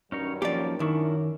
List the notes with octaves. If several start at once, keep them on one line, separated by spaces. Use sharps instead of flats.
G2 D#3 F#3 C#4 D#4 C#5
F3 A#3 C#4 G4 D5
F#2 D#3 D4 E4 A#4 C#6